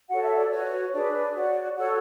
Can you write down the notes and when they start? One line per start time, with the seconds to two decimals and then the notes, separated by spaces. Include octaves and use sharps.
0.09 F#4 A4 C#5 F#5
0.23 E5
0.37 D5
0.51 F#4 B4 C#5
0.92 D4 G#4 B4 D5
1.34 F#4 C#5
1.76 F#4 A4 C#5 F#5